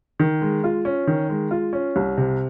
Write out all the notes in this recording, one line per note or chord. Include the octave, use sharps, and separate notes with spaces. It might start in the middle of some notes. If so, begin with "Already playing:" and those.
D#3
G#3
F4
C#4
D#3
G#3
F4
C#4
C2
C3